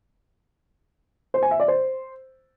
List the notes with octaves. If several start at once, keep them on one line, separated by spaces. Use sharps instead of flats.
C5
G#5
E5
D5
C5